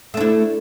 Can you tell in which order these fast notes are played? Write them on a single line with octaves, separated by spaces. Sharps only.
A3 D4 E4